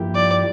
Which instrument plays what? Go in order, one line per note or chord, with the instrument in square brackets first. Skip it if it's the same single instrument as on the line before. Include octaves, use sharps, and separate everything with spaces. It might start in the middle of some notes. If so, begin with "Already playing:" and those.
Already playing: [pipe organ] G2 F3 A#3 E4 G4
[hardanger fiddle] D5